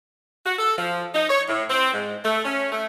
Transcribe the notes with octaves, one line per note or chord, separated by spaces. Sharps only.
F#4
A4
F3
D#4
C#5
A2
C4
G#2
A3
C#4
A3